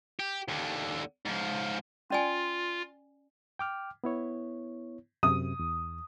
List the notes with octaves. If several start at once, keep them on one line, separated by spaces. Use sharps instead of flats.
G4
D#2 D3
G#2 F3
C#4 F4 D5 G#5
G5 D6 F6
B3 E4 C#5
F#2 C3 D#6
E2